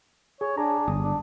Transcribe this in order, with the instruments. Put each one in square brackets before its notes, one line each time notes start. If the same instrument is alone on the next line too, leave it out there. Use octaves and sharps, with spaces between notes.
[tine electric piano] G#4 [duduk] C#5
[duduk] D4 [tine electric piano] G#4 G#5 A#5
[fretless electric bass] G1 [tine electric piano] D#6
[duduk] D4